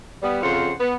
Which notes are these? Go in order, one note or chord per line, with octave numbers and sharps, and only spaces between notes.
G3 B3
F2 C#3 F4 C5 F#5
B3